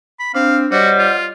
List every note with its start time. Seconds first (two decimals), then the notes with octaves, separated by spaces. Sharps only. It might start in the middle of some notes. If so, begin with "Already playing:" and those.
0.20 B5
0.35 C4 D4 F5
0.72 G3 F#4 C5 C#5 D#5 F#5
0.99 F4